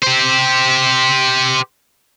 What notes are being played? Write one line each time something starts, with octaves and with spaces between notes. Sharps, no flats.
G4 C5